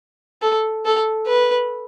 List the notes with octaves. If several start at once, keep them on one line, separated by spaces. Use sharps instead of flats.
A4
A4
B4